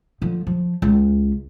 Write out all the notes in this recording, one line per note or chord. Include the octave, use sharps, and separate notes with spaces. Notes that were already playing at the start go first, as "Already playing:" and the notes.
D3 F3
F3
C#2